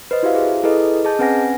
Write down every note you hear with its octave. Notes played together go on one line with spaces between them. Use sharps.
B4 C5 D#5
E4 F#4 G4 C5 E5 F5
G#4
E4 G#4 A4 B4 D#5
G#4 D#5 A5 G6
C4 C#4 B4 F#5 G#5 A#6